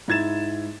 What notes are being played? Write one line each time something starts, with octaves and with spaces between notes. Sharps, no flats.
G#2 E4 G#6 A6 E7